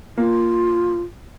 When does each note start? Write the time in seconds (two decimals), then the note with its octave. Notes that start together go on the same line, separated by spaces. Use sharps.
0.18 A#3 F4